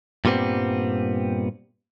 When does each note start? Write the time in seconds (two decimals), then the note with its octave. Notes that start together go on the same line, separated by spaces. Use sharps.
0.25 G2 A#2 G3 B3 C4